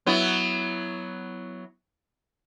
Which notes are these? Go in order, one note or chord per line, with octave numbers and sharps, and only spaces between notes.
F#3 B3 E4